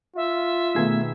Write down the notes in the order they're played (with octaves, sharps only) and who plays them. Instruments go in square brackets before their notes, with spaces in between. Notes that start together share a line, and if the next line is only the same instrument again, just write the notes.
[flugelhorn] F4 [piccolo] E5
[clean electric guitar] B2 D#3 G#4 [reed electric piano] A3 B3 G#6